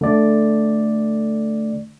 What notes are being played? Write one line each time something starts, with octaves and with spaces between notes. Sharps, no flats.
D3 A3 D5